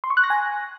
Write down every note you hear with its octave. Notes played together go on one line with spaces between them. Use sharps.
C6
C#6
F#6
A#6
G#5